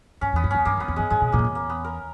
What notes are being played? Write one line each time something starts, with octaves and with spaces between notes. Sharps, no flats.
G2 C#4
E2 B3
G2
E2 C#4
G2 A#3
E2
B3
E2
G2 G#3
G#2 G#3
B2
A#2 A#3
G2
E2
A#3
B3
A#4